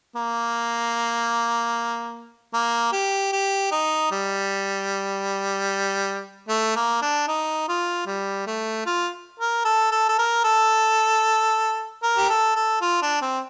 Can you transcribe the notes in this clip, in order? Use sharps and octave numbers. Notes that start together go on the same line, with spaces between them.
A#3
A#3
G4
G4
D#4
G3
A3
A#3
D4
D#4
F4
G3
A3
F4
A#4
A4
A4
A4
A#4
A4
A#4
G4
A4
A4
F4
D4
C4